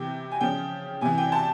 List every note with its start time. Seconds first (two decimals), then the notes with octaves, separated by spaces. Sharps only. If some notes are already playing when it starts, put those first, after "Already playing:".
Already playing: C3 E3 G5
0.31 G#5
0.40 C#3 F3 G5
1.01 C3 E3 G#5
1.18 G5
1.32 A5